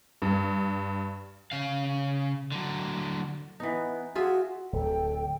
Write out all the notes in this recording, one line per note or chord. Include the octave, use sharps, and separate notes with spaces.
G2
C#3 F5
D3 F#3
E3 B3 D#4
F4 F#4 G#4 E5
D1 A4 G5